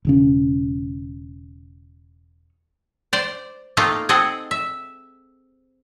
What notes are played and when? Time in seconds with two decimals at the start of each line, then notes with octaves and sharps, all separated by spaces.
0.05 E1 C#3 C#4
3.13 C5 D5
3.77 A3 A#3 C4 D#4 F4
4.09 C4 G#4 A4 D#5 F#5
4.51 E5